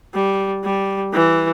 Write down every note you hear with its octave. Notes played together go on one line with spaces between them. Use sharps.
G3
G3
E3